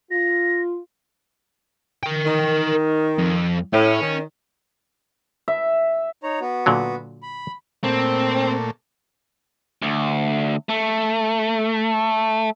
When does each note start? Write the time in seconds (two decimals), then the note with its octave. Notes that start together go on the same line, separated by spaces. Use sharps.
0.11 F4 A#6
2.03 A#4 G5
2.26 D#3
3.19 F2
3.73 A2 C#4
4.01 D#3
5.48 E5
6.23 D#4 C#5 A#5
6.41 B3 F#4
6.66 A#2 D3 F#3
7.23 B5
7.84 A#2 A3 C4
9.82 D2
10.69 A3